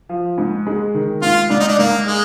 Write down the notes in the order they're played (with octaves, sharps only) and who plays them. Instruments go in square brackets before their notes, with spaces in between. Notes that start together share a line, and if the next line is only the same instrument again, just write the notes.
[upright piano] F3
G#2
G#3
D#3
[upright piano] G#2 [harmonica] F4
[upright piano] G#2 [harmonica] D4
[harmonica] D#4
D4
[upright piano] G#2 [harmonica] A#3
[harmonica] G#3